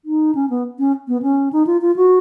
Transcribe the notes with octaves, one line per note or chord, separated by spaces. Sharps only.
D#4
C#4
B3
C#4
B3
C#4
D#4
F4
F4
F#4